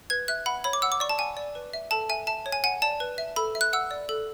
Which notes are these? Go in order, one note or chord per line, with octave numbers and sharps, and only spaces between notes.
B4 G#6
E5 F#6
F#5 B5
C#5 B5
D6
F#5 E6
D6
D5 C#6
A5
F#5 G#5
D5
B4
E5
A4 A5
E5 G#5
E5 A5
C#5
G#5
F#5 G#5
D5 A5
B4
E5
A4 B5
E5
F#6
F#5 E6
D5
A4